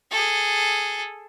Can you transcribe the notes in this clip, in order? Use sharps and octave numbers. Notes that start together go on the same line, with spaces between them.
G#4 A4